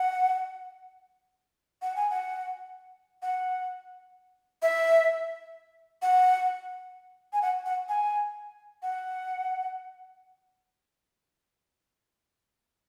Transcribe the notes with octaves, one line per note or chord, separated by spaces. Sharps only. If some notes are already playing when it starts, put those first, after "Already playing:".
Already playing: F#5
F#5
G#5
F#5
F#5
E5
F#5
G#5
F#5
F#5
G#5
F#5